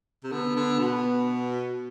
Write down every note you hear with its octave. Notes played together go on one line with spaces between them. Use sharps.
C3
D3 B3
D3
B2